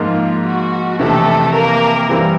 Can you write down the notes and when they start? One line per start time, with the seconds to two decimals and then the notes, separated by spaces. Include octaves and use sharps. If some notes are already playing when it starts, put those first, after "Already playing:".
Already playing: G#2 F3 A#3 F4
0.44 F#4
0.99 F2 C3 E3 A3 A4
1.54 A#3 A#4
2.09 E3 G3 C4